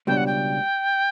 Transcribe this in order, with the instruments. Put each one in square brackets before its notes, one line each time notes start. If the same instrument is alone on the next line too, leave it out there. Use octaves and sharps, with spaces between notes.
[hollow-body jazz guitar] C#2 B2 G3 D4 [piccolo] G5
[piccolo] F#5
G5